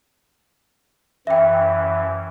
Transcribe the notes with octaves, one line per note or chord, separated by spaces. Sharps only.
F#2 E3 E5 G5